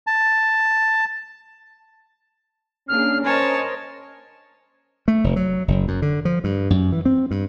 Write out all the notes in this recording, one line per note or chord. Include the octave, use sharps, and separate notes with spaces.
A5
A#3 C#4 D4 G#4 F6
A#4 C5 C#5 D#5 G#5 A5
A3
F1
F#3
F#1
F#2
D3
F3
G2
F#2
E3
C4
G2